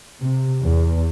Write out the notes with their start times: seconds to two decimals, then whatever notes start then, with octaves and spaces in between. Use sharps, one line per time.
0.22 C3
0.62 E2